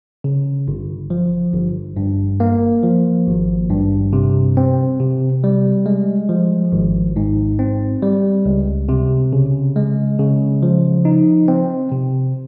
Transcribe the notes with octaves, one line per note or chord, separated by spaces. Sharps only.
C#3
G1
F3
G1
G2
A#3
F3
G#1
G2
C3
C4
C3
G3
G#3
F3
G#1
G#2
C4
G3
C#2
C3
C#3
G#3
C#3
F3
D#4
C4
C3